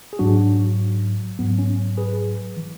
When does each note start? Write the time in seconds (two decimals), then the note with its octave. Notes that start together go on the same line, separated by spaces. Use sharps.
0.13 G#4
0.19 G#2 F#3 D4 F#4
1.39 G#2 F#3 B3
1.59 C#4
1.97 G#4 B4
2.57 E3